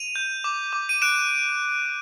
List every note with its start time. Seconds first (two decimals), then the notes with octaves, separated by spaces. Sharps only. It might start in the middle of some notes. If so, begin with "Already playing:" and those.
Already playing: D#7 F7
0.16 G6
0.44 D6
0.73 D6
0.89 D#7
1.02 F#6 D7 E7